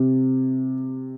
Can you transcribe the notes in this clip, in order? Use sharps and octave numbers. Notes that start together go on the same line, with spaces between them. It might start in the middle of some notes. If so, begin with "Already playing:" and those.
Already playing: C3